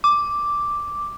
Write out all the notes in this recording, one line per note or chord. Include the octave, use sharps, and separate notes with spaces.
D6